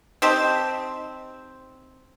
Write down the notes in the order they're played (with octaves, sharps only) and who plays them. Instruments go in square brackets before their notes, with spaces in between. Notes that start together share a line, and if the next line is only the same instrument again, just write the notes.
[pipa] C4 D#4 G4 A5